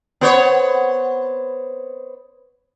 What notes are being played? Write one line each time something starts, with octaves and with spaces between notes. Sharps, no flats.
B3 C5 C#5